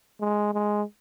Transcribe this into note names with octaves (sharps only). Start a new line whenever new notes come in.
G#3
G#3